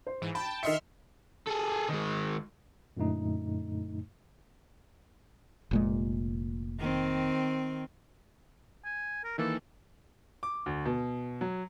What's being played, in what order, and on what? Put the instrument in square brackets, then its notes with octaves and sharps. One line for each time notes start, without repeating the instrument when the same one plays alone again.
[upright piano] C5
[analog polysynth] G#2 E3
[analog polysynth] G5 A5 [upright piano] B5
[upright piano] D#3 D#5 C#7 [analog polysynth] E5 C6 F6
[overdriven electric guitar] G#4 A4
D#3 G#3
[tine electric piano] F#2 A#2 D3 A3 D#4
[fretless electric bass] F1 A#2 G#3
[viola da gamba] D#3 C4
[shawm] G#5
A#4
[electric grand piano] D#3 E3 A#3 [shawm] A4
[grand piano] D6
D2
B2
F#3